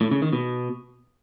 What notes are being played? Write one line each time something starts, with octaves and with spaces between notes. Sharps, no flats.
A2
C#3
D#3
B2